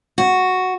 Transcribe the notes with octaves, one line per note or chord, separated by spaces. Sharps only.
F#4